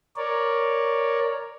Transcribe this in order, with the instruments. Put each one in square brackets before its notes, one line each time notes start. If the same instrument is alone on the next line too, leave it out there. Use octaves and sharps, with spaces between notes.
[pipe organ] A#4 C#5 D5